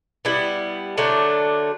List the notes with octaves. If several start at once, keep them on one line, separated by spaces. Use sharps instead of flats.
G3 B3 E4
D3 F#3 A3 D4